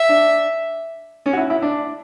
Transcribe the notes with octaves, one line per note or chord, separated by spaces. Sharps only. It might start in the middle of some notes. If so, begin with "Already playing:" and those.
Already playing: E5
D4
C#4
F#4
E4
E4
D4